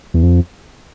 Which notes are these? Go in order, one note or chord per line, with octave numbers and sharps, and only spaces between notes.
E2
F2